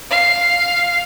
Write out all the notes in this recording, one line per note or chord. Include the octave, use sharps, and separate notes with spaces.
F5